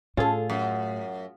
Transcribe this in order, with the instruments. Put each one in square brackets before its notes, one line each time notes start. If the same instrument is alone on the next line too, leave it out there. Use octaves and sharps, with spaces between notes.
[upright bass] A2 [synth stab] C#4 A4 [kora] F4 G#4
[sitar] F#2